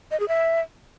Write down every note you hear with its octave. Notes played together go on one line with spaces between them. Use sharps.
D#5
G#4
E5